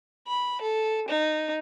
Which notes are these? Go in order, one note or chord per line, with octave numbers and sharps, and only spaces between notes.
B5
A4
D#4